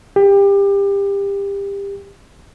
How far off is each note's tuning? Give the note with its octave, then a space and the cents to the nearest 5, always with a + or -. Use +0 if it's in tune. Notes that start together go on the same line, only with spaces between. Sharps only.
G4 +25